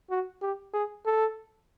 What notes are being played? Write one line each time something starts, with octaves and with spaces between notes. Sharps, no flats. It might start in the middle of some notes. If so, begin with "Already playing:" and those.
F#4
G4
G#4
A4